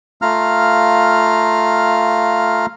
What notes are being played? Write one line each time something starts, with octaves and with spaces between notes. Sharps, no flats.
A3 F4 F5 A#5 F6